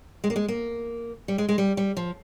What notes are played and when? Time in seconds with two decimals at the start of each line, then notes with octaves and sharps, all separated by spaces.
0.24 G#3
0.30 A#3
0.36 G#3
0.48 A#3
1.28 G3
1.38 G#3
1.49 G#3
1.58 G3
1.77 G3
1.97 F3